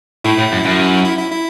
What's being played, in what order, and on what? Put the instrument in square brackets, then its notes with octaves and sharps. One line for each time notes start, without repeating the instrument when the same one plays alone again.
[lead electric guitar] A2 [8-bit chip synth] E4
[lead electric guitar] A2
F#2
F#2
[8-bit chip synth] E4
E4
E4